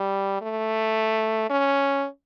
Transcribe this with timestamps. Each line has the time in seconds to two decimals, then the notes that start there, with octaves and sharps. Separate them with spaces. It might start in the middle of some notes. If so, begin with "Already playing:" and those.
Already playing: G3
0.42 A3
1.50 C#4